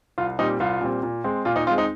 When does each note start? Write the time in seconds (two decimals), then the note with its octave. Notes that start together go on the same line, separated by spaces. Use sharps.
0.18 C2 F4
0.39 A#2 G3 C4 D#4
0.60 C2 F4
0.81 A#2 G3 C4
1.03 A#2
1.24 G#3 C4
1.45 A#2 F4
1.56 D#4
1.67 C4 F4
1.71 G#3
1.78 D#4